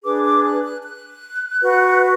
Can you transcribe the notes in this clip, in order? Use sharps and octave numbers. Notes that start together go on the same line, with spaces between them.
D4 G#4 B4 D6
D6
F#6
F#6
F#6
F#4 B4